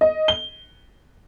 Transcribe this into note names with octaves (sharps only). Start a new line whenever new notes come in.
D#5
G7